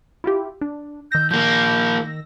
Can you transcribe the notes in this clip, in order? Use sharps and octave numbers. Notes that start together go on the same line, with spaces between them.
E4 F4 G4
D4
D#3 E6 G6 A#6
F3 A#3 G6